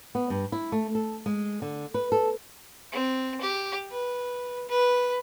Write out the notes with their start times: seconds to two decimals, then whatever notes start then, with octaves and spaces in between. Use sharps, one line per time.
0.15 B3
0.30 G2
0.52 E4
0.72 A3
0.95 A4
1.26 G#3
1.62 D3
1.94 B4
2.12 A4
2.92 C4
3.41 G4
3.91 B4
4.69 B4